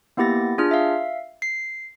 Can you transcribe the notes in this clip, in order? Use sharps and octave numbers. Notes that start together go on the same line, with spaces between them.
A#3 B3 E4 G4 A6 A#6
D4 F4 G#4 F6
E5 F5
C7